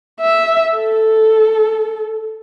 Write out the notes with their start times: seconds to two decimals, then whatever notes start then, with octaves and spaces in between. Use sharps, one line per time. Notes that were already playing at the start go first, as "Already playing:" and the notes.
0.21 E5
0.73 A4